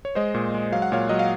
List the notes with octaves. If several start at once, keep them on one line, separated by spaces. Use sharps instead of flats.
C#5
G#3 C5 D#5
A#2
G#3
F#3 F5
F#5
A#2 C#5 F5
F#3 D#5
F5